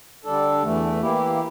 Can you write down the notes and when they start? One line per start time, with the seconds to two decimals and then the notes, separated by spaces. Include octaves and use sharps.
0.24 D3 G3 D4 A4
0.63 E2 E3 A3
1.02 E3 A#3 E4 G4